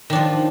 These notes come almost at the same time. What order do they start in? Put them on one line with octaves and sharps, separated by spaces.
D#3 D4 F3